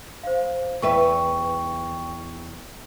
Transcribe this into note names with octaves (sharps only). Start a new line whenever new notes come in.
C5 F5
E2 B4 E5 G5 C#6